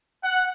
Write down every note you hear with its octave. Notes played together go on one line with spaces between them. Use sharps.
F#5